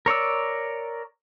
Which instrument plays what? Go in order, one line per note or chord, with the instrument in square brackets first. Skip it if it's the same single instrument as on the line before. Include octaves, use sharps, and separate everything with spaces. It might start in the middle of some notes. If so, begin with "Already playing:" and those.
[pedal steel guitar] A#4 C#5 D5 E6